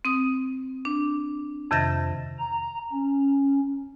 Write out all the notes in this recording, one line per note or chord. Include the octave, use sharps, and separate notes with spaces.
C4 D#6
D4
F2 C3 D#3 E5 A6 A#6
A#5
C#4